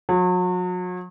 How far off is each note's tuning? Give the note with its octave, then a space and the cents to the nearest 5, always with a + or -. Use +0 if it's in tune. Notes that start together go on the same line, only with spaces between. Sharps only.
F#3 -40